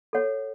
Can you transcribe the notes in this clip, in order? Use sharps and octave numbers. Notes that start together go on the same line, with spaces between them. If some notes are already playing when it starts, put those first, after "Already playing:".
A4 C#5 F#5